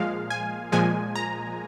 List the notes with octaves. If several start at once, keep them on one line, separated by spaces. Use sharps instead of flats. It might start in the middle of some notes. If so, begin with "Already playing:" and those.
Already playing: A#2 F3 G#3 F5
G#5
A#2 F3 G#3 G#5
A#5